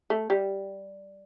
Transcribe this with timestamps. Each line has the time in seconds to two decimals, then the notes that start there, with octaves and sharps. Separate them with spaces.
0.10 A3
0.30 G3